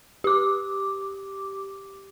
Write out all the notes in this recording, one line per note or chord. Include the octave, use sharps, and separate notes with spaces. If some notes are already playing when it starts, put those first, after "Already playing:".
G4 D6